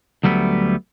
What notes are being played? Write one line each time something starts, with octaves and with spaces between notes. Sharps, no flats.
D2 F#3 G3 A3 B3